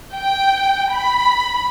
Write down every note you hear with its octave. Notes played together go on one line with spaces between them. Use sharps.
G5
B5